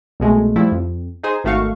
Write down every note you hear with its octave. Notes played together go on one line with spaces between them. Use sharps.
C2 B2 G#3 A3
F3 G3 A3 E4
F2
D#4 G#4 C5
G#1 D#3 A3 F#4 F5 C#6